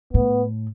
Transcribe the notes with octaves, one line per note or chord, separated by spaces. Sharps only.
A2 B3